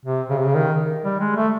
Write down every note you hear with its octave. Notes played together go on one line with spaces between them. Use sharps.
C3
C#3
C3
C#3
D#3
G3
G#3
A3